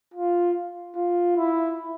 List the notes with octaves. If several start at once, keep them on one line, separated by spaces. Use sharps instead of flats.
F4
F4
E4